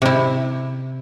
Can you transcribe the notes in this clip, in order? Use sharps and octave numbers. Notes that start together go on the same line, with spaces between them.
C3 E4